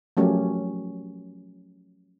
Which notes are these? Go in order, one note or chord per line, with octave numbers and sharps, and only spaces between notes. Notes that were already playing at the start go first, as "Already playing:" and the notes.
F3 F#3 A3 C#4 G4 A#4